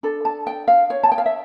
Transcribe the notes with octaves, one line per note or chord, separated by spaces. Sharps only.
D4 A4
A5
G5
F5
C#5
A5
G5
F5
E5